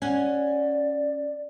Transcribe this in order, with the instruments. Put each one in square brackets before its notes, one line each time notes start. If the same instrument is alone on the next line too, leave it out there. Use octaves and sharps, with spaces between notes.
[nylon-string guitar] C#4 [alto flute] D5 [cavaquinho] F#5 G#5